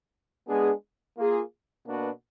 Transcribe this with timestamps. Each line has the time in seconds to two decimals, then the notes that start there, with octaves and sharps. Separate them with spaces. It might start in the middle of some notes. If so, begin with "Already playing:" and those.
0.47 G#3 B3 D4 G#4
1.17 A#3 F4 G#4
1.86 B2 A#3 D4 F#4 B4